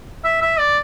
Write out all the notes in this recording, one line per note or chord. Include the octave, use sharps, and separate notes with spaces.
E5
E5
D5